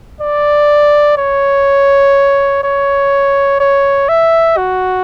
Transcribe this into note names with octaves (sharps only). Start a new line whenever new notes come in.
D5
C#5
C#5
C#5
E5
F#4